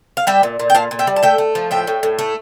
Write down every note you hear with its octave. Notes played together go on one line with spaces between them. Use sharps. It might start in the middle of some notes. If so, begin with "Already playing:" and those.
F5
G3 E5 G5
A#2
A#2
G5
A#2 F5 A5
A#2
E5 G5
G3
A5
A3 E5 G5
A3
F3
A2 E5 G5
A2
A2
A3